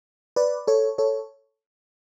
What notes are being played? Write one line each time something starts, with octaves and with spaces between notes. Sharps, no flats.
B4 D5
A4 C#5
A4 C#5